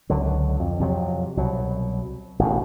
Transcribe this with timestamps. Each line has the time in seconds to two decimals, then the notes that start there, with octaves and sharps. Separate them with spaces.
0.10 C#2 D3 F#3
0.60 F2
0.80 F2 C3 F#3
1.37 C2 B2 F#3
2.39 A1 B2 D#3